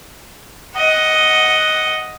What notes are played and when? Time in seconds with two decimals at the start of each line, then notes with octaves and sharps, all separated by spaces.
0.76 D#5 F#5